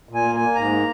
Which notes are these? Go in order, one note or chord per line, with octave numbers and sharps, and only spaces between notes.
A#2
G#5
A#3
G#5
A#3
G#2 A#5
A#3